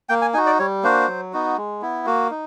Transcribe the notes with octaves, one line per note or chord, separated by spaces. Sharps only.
A#3 G5
G#5
D#4 F#4 G#5
D5
G3 C#5
A#3 D4 F#4 C5
F#3
B3 D#4 F#4
G#3
B3 E4
A#3 F#4
D#4